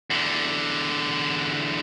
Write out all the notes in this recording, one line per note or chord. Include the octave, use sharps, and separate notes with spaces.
E2 D3